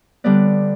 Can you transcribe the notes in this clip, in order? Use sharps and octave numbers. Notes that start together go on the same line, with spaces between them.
D3 G3 B3 D5